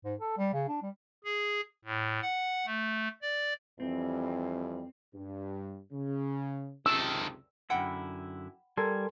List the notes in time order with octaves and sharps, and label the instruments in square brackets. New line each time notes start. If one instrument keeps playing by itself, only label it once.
[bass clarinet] G#2
A4
G3
C#3
D4
G3
[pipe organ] G#4
A2
F#5
A3
D5
[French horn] F2 [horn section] E3 G3 [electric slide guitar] C4
[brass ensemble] G2
C#3
[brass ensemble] C#2 F#2 C3 [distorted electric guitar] D#3 A4 [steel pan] E6
[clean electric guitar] F#2 D3 E4 [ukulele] F#5 G5 B5
[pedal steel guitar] G3 [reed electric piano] A4 A#4 C6 [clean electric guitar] G#5